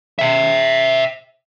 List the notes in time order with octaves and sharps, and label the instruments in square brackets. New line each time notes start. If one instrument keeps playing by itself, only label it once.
[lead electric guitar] E5 G5